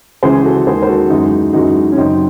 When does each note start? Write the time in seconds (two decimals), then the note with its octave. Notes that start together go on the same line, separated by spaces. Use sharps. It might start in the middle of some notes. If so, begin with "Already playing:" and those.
0.23 C#2 C#3 E3 G#4 C5
0.44 F#4 A4
0.66 D#2 D#3 G#3 G#4 C5
0.83 C5
0.88 F#4 A4
1.10 F#2 E3 G#3 D#4 F#4
1.53 F#2 E3 G#3 D#4 F#4
1.92 C#4
1.97 F#2 C#3 F#3 C4 D#4